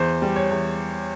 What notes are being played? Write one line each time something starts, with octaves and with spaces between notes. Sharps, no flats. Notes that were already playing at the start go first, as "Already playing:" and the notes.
Already playing: E2 C5
G3
C#5
E2